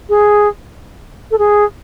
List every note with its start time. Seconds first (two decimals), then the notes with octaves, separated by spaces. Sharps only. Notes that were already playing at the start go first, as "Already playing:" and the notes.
0.09 G#4
1.31 A4
1.39 G#4